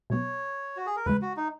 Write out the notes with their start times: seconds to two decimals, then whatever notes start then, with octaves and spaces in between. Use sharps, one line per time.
0.10 B2 F#3 B3 C#5
0.77 F#4
0.86 G#4
0.96 A#4
1.06 E2 C#3 G#3 B4
1.22 F#4
1.37 D#4